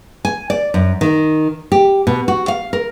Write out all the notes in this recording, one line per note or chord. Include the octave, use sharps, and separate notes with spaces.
G#5
D5
F#2
D#3
G4
B2
F#4
F5
A#4